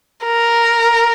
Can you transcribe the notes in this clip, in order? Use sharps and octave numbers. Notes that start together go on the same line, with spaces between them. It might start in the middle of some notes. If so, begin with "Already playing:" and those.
A#4